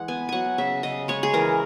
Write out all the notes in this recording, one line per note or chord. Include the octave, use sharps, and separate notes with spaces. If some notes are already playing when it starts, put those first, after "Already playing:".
Already playing: E3 G#3 F#5
B3 G#5
F#3 F#5 G#5
C#3 E5
C#3 D#5
G#3 C#5
G#4
E3 A#4